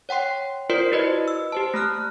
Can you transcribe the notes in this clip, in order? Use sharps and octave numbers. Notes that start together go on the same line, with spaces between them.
C#5 F#5 G5 C6 C7
F4 A#4 C5 D5 C6 C7
E4 F#4 B4 C5 D#5
E6
G4 C5 A5
A3 A#5 F6 F#6